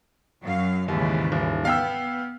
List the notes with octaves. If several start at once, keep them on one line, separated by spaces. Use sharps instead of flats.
F#2 F#3 F5
D#2 G#2 C#3 E3
D#1
B3 F5 G5 E6